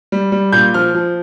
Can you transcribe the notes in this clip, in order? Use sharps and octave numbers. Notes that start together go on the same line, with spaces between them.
G3
G3
A#2 G6
F3 F6
F3